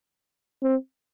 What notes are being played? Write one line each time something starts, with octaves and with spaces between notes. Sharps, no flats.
C4